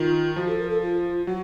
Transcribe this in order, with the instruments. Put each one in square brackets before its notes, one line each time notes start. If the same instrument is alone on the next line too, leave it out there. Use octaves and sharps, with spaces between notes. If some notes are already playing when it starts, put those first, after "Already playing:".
Already playing: [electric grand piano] D#3 [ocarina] F4
[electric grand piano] F3 [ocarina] F#4
[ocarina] A4
A#4
A4
F4
[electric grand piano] F#3 [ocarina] F#4